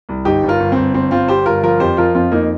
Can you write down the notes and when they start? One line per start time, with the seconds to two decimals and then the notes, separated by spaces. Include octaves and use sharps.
0.09 C2
0.25 G1 D#4 G4
0.43 G1
0.48 F4 A#4
0.60 G1
0.72 G1 C4
0.94 G1 C4
1.11 G1 C4 F4
1.28 G3 G4 C5
1.46 G1 F4 A#4
1.63 F3 F4 A#4
1.80 F2 G4 C5
1.97 F3 F4 A#4
2.15 F2 C4 F4
2.31 F2 A#3 D#4